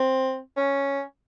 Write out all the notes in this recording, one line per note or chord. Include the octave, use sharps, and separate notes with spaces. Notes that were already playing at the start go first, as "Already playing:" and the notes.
Already playing: C4
C#4